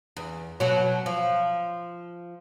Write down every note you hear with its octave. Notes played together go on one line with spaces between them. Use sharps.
E2
B2 F#3
F3